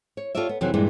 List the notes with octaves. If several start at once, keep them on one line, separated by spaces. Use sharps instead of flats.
C#5
F4 G4 A4 C#5 D5 E5
B3
F2 C3 E3 F#3
G2 A#2 E3 G#3